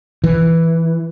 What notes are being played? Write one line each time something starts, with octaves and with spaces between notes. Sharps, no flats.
E3